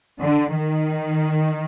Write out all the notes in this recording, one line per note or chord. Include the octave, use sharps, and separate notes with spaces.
D3
D#3